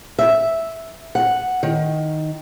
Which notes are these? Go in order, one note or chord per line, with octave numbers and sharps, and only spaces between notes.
E5
F#5
D#3